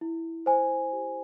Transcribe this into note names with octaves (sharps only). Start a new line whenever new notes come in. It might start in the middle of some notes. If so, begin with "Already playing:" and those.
E4
C5 G#5
G4